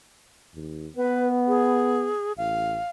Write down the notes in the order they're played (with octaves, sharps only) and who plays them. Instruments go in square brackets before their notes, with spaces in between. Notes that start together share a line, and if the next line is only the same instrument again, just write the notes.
[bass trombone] D#2
[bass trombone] B3 [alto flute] B4
[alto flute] G#4
[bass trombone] A1 [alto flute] F5